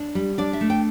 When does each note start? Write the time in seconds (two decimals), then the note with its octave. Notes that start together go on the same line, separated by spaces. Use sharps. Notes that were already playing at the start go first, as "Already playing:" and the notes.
Already playing: D4
0.15 G3
0.38 D4 D5
0.53 E5
0.61 A3
0.70 G5